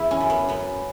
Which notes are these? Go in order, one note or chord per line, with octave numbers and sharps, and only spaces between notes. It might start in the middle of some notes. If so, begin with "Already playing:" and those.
Already playing: E2 E4
C#4
F#2
B3
F#2 B3